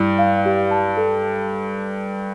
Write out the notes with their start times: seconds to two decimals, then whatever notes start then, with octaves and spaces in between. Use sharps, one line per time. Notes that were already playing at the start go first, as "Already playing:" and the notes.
Already playing: G2 E4
0.19 F5
0.46 G4
0.71 A5
0.97 A4